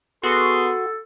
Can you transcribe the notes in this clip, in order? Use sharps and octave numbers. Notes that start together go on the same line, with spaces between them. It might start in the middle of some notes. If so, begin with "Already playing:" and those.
B3 F#4 G#4 A4 C6